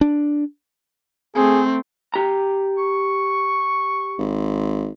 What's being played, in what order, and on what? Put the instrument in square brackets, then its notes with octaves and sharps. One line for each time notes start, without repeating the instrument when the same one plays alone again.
[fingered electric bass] D4
[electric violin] A3 C4 [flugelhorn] G#4
[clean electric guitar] G4 A#5
[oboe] C#6
[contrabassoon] G#1